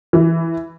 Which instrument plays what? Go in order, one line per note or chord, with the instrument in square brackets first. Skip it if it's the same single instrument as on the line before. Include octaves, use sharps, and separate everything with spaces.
[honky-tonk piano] E3